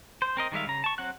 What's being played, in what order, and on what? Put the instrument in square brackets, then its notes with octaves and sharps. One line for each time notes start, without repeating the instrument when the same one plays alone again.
[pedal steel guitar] C5
C4 A#4 D#5
D#3 G3 G#3 E5 F5
C#3 A#5
A5 C#6
F#3 C4 F#5 F#6